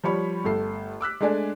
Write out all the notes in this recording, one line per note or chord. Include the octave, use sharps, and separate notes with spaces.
F3 G3 C#5 B5 C#6
G1 A3 A4 C7
D6 E6 F#6 B6
G#3 A3 D4 D5 G#5